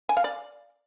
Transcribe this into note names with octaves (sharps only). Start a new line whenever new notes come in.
G#5
F5
D5